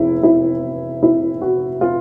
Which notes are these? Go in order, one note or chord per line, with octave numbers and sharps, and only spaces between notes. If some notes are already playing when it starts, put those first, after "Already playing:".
Already playing: F1 E2 E4
E4
E4
F#4
F4